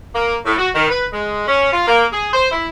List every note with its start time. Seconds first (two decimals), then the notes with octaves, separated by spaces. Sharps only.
0.15 A#3
0.45 A2
0.58 F#4
0.75 D#3
0.88 B4
1.12 G#3
1.48 C#4
1.73 F4
1.87 A#3
2.12 G#4
2.33 C5
2.52 E4